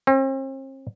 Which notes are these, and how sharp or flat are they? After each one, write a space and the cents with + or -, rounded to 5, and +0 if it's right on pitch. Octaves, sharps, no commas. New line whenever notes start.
C4 +45